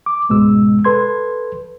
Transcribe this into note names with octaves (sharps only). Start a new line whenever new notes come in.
D6
C#2 G#2 B2 G#3 E6
A4 B4 C6 G#6